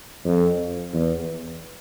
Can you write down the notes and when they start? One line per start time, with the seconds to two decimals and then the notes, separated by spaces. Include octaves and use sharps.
0.25 F2
0.94 E2